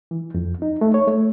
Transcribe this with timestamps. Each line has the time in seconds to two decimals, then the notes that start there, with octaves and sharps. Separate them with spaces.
0.11 E3
0.35 F2
0.62 D#4
0.81 A3
0.94 C#5
1.07 A3